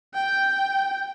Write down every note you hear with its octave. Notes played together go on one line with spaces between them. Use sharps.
G5